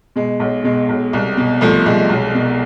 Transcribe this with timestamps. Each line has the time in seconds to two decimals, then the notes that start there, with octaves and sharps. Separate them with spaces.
0.16 B2 G#3
0.40 B1
0.64 B2 G#3
0.89 B1
1.13 C2
1.37 B2
1.61 C2 F3 A3
1.86 C2 G#3
2.09 B1
2.34 B2